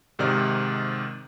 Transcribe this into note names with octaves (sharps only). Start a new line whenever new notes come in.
G#2 C3 D#3 D5 D#6 F6